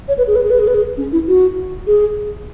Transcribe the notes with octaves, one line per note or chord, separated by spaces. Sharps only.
C#5
B4
G#4
B4
G#4
B4
G#4
B4
G#4
C#4
E4
F#4
G#4